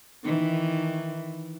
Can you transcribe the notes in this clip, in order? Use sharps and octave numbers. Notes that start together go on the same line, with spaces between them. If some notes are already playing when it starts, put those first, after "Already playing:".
D#3 E3